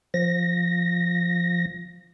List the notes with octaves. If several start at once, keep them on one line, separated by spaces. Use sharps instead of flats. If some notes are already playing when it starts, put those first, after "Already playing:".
F3 A#6